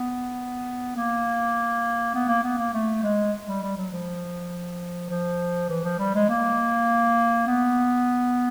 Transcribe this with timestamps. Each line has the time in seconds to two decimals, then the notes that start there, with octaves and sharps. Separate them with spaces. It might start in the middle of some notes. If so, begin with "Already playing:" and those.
Already playing: B3
0.96 A#3
2.14 B3
2.28 A#3
2.43 B3
2.58 A#3
2.74 A3
3.03 G#3
3.48 G3
3.63 G3
3.77 F#3
3.92 F3
5.10 F3
5.70 E3
5.85 F3
5.99 G3
6.15 G#3
6.30 A#3
7.47 B3